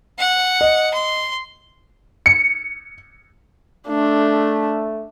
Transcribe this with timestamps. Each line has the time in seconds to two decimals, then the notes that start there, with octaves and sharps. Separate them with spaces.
0.19 F#5
0.61 D#5
0.94 C6
2.26 C#7
3.88 A3 D4